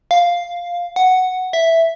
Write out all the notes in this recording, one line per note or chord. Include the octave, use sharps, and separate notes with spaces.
F5
F#5
E5